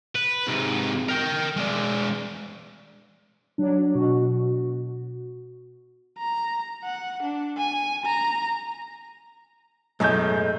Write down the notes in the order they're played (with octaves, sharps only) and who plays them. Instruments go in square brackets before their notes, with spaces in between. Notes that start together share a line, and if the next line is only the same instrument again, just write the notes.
[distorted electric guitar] B4
G#2 C3
A#4 G5
G#3 D4
[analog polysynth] F#3 D4
B2 F#4
[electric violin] A#5
F#5
D4
G#5
A#5
[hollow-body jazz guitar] B1 A2 G#3 [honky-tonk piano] F#2 G6